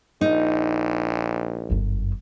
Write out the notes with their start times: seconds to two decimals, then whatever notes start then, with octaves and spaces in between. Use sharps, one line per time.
0.21 A#1 D#4
1.70 G1 F#2